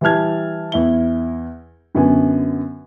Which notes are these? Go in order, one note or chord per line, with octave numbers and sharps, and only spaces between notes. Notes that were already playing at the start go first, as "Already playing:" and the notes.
E3 G3 E4 A5 F6 G#6
E2 E4 G7
F#2 D3 B3 G#5